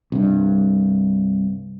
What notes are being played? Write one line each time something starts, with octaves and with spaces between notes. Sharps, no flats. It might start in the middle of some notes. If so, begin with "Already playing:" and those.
C2 G2